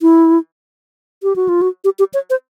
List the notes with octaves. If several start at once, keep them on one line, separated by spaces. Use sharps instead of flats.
E4
G4
F#4
F4
F#4
G4
G4
C#5
C5